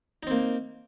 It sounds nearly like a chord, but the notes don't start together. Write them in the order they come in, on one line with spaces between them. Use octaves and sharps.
D#4 C4 A#3